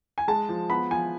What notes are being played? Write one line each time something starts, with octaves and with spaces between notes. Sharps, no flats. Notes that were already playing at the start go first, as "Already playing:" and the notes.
G#5
G#3 A5
F3
B3 B5
F3 G#5